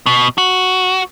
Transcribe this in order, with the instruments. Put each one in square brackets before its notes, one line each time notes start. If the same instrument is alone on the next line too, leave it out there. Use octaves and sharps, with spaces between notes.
[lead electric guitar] B2
F#4